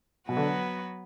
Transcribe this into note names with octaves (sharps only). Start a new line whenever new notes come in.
B2 F#3 B3 F#4 B4
D3